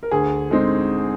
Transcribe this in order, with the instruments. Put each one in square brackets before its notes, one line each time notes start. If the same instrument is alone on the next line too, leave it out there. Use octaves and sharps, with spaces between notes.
[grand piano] A#4
D2 G#4
D3 G#3 C4 D#4